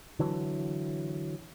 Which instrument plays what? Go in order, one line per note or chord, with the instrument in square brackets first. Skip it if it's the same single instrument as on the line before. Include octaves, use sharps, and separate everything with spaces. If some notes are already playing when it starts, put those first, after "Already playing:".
[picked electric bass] D3 E3 F#3